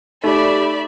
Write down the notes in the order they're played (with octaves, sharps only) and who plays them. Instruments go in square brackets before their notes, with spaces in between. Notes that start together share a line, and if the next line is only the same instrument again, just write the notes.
[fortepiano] A3 [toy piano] D#4 [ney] G4 [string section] D5 E5 B5